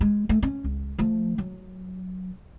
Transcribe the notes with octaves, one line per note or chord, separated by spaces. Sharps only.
G#3
A3
C#4
C#2
F3 A3
F#3